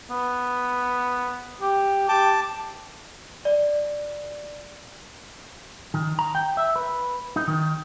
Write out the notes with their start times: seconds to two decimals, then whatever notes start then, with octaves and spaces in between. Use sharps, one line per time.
0.10 B3
1.61 G4
2.09 G4 A5 D6
3.45 D5
5.94 D#3
6.19 A#5
6.35 G5
6.57 E5
6.76 B4
7.36 D#4
7.48 D#3